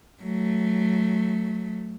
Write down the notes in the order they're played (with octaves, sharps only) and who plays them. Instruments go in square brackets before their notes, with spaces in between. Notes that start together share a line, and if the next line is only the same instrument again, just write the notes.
[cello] F#3 A3